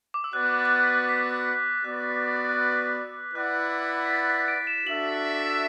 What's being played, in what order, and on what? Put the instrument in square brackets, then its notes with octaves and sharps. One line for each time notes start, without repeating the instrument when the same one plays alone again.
[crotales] D6
E6
[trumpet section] B3 F#4 B4 D5 F#5 [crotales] F#6
[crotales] A6
F#6
A6
B6
B6
[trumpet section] B3 F#4 B4 D5 [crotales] F#6
[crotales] F#6
E6
[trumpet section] E4 B4 D5 F#5 [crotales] F#6
[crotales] B6
A6
B6
D7
E7
[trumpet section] D4 F#4 A4 E5 [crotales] F#7